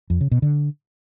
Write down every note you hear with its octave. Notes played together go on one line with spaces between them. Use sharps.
F2
C#3
B2
D3